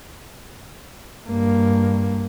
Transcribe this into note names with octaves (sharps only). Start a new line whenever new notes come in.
G2 A#3